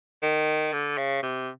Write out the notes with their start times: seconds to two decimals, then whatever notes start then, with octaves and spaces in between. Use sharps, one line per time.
0.22 D#3
0.73 D3
0.98 C#3
1.23 C3